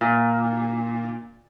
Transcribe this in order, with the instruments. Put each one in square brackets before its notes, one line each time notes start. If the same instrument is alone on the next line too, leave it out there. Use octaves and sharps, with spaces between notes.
[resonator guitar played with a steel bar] A#2